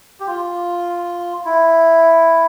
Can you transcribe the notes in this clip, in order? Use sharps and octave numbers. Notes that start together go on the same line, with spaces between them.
G4
F4
E4